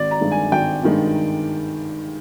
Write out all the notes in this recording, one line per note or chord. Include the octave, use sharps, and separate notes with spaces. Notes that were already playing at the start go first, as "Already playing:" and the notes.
Already playing: G#1 D5
A#5
G2 D#3 G#3
G#5
G#1 G5
G2 D#3 G#3